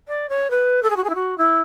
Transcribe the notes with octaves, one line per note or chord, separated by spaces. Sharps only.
D5
C#5
B4
A4
G#4
F#4
G#4
E4
F#4
E4